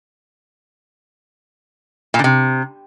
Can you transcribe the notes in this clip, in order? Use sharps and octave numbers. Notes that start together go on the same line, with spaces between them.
A#2
D3
C3